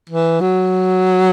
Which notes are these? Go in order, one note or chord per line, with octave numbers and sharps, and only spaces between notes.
E3
F#3